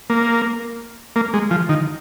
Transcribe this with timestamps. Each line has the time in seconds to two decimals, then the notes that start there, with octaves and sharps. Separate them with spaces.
0.10 A#3
1.16 A#3
1.34 G#3
1.51 F3
1.69 D#3